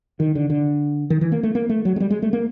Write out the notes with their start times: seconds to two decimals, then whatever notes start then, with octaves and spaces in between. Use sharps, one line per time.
0.20 D#3
0.35 D3
0.50 D3
1.10 D#3
1.21 E3
1.32 A#3
1.43 A3
1.55 A#3
1.69 A3
1.85 F#3
1.96 G#3
2.00 G3
2.10 G#3
2.22 A3
2.33 A#3